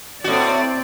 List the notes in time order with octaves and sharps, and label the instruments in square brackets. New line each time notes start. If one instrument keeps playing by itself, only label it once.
[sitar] A2 F#4 [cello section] C4 D5